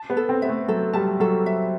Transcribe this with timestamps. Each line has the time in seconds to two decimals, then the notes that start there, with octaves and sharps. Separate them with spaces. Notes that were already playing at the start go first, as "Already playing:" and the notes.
Already playing: A5
0.10 B3
0.17 A4
0.29 C4
0.42 B3 E5
0.49 A3
0.68 F#3 A4
0.93 G3 A5
1.20 F#3 A4
1.46 E5